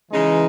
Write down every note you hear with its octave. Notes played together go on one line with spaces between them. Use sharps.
C#3 E3 G#3 D#4